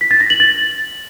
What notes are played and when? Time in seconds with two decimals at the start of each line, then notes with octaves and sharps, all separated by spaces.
0.01 B6
0.11 A6
0.20 A#6
0.30 F#7
0.40 A6